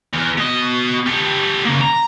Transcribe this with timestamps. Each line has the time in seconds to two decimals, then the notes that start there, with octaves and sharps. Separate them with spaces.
0.13 E2
0.37 B2 D#5
1.06 G4 A4
1.65 C#3 A#3
1.81 A#5